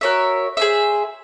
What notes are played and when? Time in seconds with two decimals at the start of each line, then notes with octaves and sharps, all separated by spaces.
0.01 F#4 A#4 C#5 E5
0.57 G#4 C5 E5